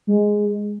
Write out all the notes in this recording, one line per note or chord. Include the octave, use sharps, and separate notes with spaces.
G#3